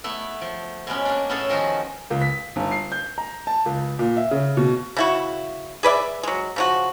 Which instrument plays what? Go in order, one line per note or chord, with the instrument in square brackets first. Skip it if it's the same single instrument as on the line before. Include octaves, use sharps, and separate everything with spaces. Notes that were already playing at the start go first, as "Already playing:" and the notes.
[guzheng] A3 B3 E4
F3
B2 G#3 B3 C#4
A#3 D4
A2 B3 C#4 G#4 A4
D#3 F3 D#4 F#4
[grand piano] C#2
B6
G1
C7
G6
A#5
A5
C#2
A#2
E5
C#3
B2
[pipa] C#3 E4 F#4
G#4 B4 D5 E5
F#3 G#3
C#3 F3 F#4